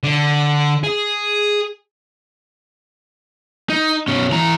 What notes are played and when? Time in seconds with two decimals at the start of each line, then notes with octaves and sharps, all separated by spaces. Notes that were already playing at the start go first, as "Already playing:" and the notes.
0.03 D3
0.84 G#4
3.70 D#4
4.08 B2 C#4
4.32 E3 A#5